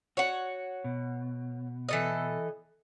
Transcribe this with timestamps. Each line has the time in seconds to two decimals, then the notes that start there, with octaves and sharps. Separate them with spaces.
0.17 F#4 C#5 F#5
0.84 B2
1.89 E3 A4 D#5